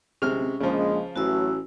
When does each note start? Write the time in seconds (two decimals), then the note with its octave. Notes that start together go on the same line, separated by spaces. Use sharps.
0.22 D1 C3 G#3 C#4 F6
0.60 A#1 C#3 F3 G#3
1.16 A1 E3 F#3 A3 F#4 E6